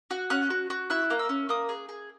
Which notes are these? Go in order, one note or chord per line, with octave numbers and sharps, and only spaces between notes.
F#4
C#4 F#6
F#4
F#4
E4 F#6
A#3
E6
C#4
A#3 D#6
G#4
G#4